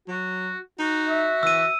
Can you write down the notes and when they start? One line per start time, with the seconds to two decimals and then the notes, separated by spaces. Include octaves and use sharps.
0.08 F#3 F#4
0.79 D#4 F#4
1.08 E5
1.43 E3 E6 D#7